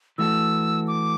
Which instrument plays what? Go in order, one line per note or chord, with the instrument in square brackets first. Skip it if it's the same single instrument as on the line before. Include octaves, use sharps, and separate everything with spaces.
[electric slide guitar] E3 A3 F#4 A4 [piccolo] E6
[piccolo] D6